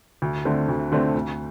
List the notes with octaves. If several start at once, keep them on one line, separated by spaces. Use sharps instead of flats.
D2
D3 A3 C4
D2
D3 A3 C4
D2